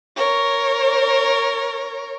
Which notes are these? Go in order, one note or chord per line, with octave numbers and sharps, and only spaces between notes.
A#4 C#5